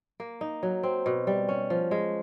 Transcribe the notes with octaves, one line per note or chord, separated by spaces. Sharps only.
A#3
D#4
F#3
C4
B2
G3
C#4
F3
G#3